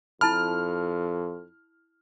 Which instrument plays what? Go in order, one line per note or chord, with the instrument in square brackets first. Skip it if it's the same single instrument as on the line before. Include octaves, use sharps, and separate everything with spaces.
[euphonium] F2 [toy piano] E4 A5 B5 [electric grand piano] F6